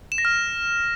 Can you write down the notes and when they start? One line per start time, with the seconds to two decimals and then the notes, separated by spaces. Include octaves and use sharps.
0.12 E7
0.18 A#6
0.25 F6